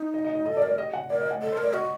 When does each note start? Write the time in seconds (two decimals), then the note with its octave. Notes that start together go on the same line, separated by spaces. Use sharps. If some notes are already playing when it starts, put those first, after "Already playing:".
Already playing: D#4
0.14 D#5
0.24 D#5
0.35 D#5
0.46 A4 D#5
0.57 D5
0.62 A#4
0.67 D5
0.78 G4 D#5
0.93 F#5
1.10 A#4 D5
1.21 D#5
1.31 F#5
1.42 A4 D#5
1.52 C5
1.57 A#4
1.63 D5
1.73 F#4 D#5